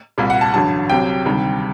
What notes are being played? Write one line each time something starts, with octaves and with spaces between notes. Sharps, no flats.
C2 A#2 G3
F#5
A5
A1 G2 D3 F#3 A5
C2 C3 F#3 G5
D2 C3 D#3 G3